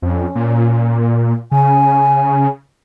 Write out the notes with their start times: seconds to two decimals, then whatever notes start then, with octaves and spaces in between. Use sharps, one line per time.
0.02 F2 C#4
0.35 A#2
1.52 C#3 G#5